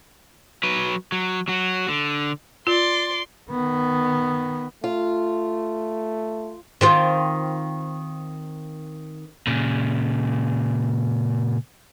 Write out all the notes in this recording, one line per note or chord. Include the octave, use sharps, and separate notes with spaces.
F#3 B4
F#3
F#3 F#4
D3
F4 D5 C6
D#3 B3
A3 F4
D#3 C4 F4
A#2 C#3